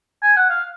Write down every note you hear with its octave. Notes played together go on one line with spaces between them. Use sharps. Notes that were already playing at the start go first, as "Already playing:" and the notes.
G#5
F#5
F5